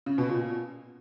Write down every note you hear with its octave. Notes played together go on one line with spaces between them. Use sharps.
C#3
B2
A#2